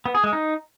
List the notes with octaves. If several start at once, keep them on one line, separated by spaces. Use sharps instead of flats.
B3
G#4
G#3
D#4